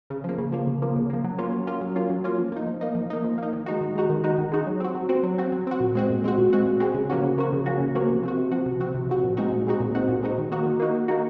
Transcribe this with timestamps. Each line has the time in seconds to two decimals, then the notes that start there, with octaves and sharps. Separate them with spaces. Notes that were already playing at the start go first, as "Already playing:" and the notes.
0.10 C#3
0.24 F3 A#3
0.38 C#3
0.52 F3 A#3
0.67 C#3
0.82 F3 A#3
0.96 C#3
1.10 F3 A#3
1.24 F#3
1.38 A#3 C#4 F4
1.53 F#3
1.67 A#3 C#4 F4
1.81 F#3
1.96 A#3 C#4 F4
2.10 F#3
2.24 A#3 C#4 F4
2.38 F3
2.52 A#3 D#4
2.67 F3
2.81 A#3 D#4
2.95 F3
3.10 A#3 D#4
3.24 F3
3.38 A#3 D#4
3.53 D#3
3.66 G#3 D#4 F#4
3.81 D#3
3.95 G#3 D#4 F#4
4.10 D#3
4.24 G#3 D#4 F#4
4.38 D#3
4.52 G#3 D#4 F#4
4.66 F#3
4.80 C4 F#4
4.95 F#3
5.09 C4 F#4
5.23 F#3
5.38 C4 F#4
5.52 F#3
5.67 C4 F#4
5.80 A#2
5.95 G#3 C4 F#4
6.10 A#2
6.24 G#3 C4 F#4
6.38 A#2
6.53 G#3 C4 F#4
6.66 A#2
6.80 G#3 C4 F#4
6.94 C#3
7.10 F3 A#3 C#4 F#4
7.24 C#3
7.38 F3 A#3 C#4 F#4
7.53 C#3
7.66 F3 A#3 C#4 F#4
7.80 C#3
7.95 F3 A#3 C#4 F#4
8.10 C3
8.23 F3 C4 F#4
8.37 C3
8.51 F3 C4 F#4
8.66 C3
8.80 F3 C4 F#4
8.95 C3
9.09 F3 C4 F#4
9.23 A#2
9.37 G#3 C4 D#4 F#4
9.52 A#2
9.67 G#3 C4 D#4 F#4
9.80 A#2
9.95 G#3 C4 D#4 F#4
10.09 A#2
10.23 G#3 C4 D#4 F#4
10.38 D#3
10.51 A#3 D#4 F#4
10.66 D#3
10.80 A#3 D#4 F#4
10.95 D#3
11.08 A#3 D#4 F#4